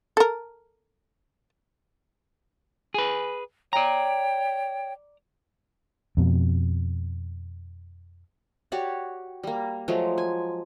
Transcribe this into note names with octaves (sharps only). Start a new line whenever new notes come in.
A4 A#4
G#4 B4
C#5 D5 G5 A#5
F2 B2
F#4 G4 C#5 D5
G3 A#3
F3 F#3 G#3 A3
G#5